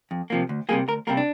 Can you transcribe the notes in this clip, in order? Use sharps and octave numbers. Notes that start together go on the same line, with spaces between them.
F2
C3 F3 A#3
D2
C3 G3 A#3 G#4
D2 A#4
C3 G3 A#3 A#4
D4